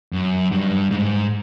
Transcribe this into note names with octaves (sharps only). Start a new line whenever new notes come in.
F#2
G2
G#2